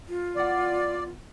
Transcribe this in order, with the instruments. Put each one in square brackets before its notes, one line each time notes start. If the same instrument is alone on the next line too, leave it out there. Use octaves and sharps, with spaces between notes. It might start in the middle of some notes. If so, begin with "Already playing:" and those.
[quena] F4
[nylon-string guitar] E2 B4 F#5 [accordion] D5